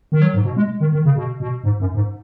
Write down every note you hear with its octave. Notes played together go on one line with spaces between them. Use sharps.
D#3
F#3
G#2
B2
G#3
D#3
D#3
C#3
B2
B2
G#2
F#2
G#2